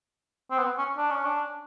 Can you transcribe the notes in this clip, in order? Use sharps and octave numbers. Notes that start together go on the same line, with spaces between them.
C4
B3
C#4
D4
C#4
D4